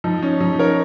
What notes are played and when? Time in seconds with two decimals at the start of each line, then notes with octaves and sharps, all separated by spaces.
0.04 F3 D#4
0.22 C#4
0.40 F3 D#4
0.59 A#4 C#5